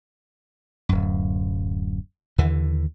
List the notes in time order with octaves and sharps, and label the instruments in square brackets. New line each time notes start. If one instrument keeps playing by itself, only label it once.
[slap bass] D1 F#2
D#2 D3 E3